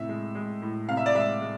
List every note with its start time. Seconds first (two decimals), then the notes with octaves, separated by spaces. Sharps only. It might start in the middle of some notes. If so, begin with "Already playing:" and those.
Already playing: A2 C3 E5
0.09 G#3
0.35 G#3
0.62 A2
0.88 C3 F5
0.97 E5
1.06 D5
1.15 G#3 E5
1.41 G#3